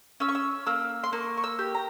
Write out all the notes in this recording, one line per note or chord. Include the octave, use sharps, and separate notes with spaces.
C#4 E6
C#6
E6
A#3 E6
C6
A#3 C#6
C#6
E6
G4
A#5